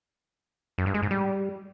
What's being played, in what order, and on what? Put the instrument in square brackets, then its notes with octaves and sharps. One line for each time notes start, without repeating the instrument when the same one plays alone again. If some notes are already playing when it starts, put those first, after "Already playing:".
[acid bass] F#2
G2
G#3
G#2
G3